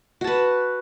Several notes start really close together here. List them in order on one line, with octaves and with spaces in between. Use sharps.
F#4 A5 B4